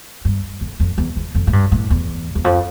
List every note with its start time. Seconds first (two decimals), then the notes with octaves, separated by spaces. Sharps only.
0.25 G2
0.61 F2
0.80 F2
0.98 E2
1.16 E2
1.35 F2
1.47 A2
1.53 G2
1.72 A2
1.90 E2
2.35 E2
2.44 F2